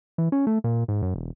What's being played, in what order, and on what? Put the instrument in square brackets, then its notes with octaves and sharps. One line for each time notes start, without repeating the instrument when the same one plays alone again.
[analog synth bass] E3
C#4
A3
A#2
G#2
F#2
E1